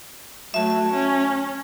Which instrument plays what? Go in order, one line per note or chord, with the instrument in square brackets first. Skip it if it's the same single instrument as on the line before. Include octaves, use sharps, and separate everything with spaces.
[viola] F#3 A3 [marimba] E5 A5
[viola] C#4